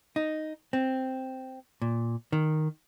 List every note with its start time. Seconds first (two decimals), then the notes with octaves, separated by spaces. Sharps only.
0.16 D#4
0.73 C4
1.82 A#2
2.32 D#3